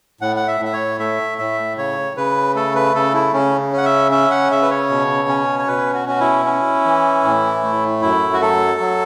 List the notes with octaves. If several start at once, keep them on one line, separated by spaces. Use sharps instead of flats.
A2 F#5
F#5
E5
A2
E5
C#5
A3 E5
A2 E5
C#3 C#5
C#3 B4
A3 A4
B4
C#3 A4
E4
C#3 C#4
C#4 F#5
E5
C#4 E5
F#5
C#3 E5
B4
C#5
B2
C#4
C#5
B2 B4
F#4
C#4 F#4
E4
C#4
E3
A2
A3
F#2 E4
F#4
F#3 A4
F#3